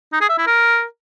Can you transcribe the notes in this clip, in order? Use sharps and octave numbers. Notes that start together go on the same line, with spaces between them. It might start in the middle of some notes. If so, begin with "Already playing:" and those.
D#4
G#4
E5
E4
A#4